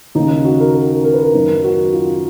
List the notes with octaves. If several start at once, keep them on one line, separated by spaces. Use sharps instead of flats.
D#2 C#3 D#4
F#4
A#4
A#4
A#4
B4
A#4
F#2 D#3
F#4
F4